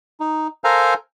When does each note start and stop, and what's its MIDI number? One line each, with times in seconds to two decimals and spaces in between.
0.20 0.47 63
0.64 0.94 69
0.64 0.94 70
0.64 0.94 72
0.64 0.94 77
0.64 0.94 80
0.64 0.94 82